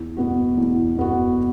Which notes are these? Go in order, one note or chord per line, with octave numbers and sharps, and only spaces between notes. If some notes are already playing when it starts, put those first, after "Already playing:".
Already playing: E2
B2 B3 F#4
E2
B2 B3 F#4